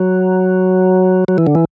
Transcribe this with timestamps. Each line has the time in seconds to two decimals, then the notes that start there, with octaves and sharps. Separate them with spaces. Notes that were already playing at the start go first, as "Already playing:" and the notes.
Already playing: F#3
1.28 F#3
1.38 E3
1.47 D3
1.55 E3